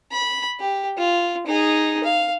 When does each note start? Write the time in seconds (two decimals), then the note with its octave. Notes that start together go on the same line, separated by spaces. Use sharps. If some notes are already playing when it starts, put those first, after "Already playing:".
0.12 B5
0.60 G4
0.98 F4
1.47 D#4 G#4
2.04 F5